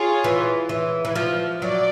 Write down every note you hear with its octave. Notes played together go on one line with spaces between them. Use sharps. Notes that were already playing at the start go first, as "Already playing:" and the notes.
Already playing: F4 G#4 C#5
E3
E3
E3
F3
F#3 D5